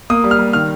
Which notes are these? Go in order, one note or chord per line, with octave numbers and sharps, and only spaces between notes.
A#3 D#6
G3
F6
G3
D#3 F6